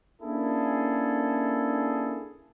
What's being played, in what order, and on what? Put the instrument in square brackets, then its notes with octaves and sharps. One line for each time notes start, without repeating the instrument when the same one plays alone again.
[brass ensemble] A#3 C#4 D4 E4 G#4 A4